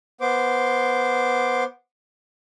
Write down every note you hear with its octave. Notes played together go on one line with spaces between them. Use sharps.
B3 C5 D6